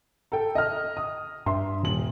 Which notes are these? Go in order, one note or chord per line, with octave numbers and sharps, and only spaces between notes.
A4 G5
D#5 F6
D#6
G2 E5 C6
D#1 F#7